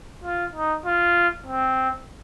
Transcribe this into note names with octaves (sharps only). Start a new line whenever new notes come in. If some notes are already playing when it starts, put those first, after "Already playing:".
F4
D#4
F4
C4